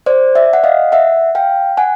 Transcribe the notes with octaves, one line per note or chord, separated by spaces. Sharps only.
C5 D5
D5 E5
F#5
D#5 F5
E5 F#5
F5 G5
F#5 G#5